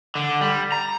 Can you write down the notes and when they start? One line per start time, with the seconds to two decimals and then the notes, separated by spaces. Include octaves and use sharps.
0.15 D3
0.41 G3
0.72 A#5